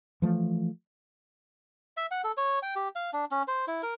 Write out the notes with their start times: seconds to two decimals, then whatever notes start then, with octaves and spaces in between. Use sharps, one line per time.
0.22 E3 F3 A3
1.97 E5
2.11 F#5
2.24 A4
2.37 C#5
2.63 G5
2.76 G4
2.96 F5
3.13 D4
3.31 C#4
3.48 C5
3.68 E4
3.83 A#4